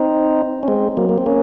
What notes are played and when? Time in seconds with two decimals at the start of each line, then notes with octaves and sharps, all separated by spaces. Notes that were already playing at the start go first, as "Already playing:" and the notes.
Already playing: C4 D#4
0.63 C#4
0.68 G#3 C4
0.97 F#3 A#3
1.09 A#3
1.18 C4
1.26 A#3 C#4